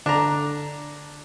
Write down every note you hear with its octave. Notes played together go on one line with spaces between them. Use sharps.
D3 D4 A#5